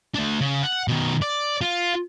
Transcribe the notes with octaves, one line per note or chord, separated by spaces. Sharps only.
A3 D4
C#3
F#5
B2 D#3
D5
F4